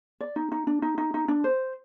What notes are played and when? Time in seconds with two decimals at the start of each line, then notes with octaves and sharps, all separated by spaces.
0.20 D5
0.36 D#4
0.52 D#4
0.67 D4
0.82 D#4
0.98 D#4
1.14 D#4
1.28 D4
1.44 C5